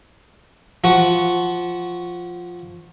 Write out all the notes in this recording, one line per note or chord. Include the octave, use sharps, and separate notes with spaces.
F3 F#4